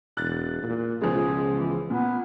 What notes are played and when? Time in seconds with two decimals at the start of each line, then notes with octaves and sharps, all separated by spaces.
0.17 E1 F#6 A6
0.63 A#2
1.02 C#2 B2 F3 G#3 G#4
1.54 E3
1.90 A#2 B3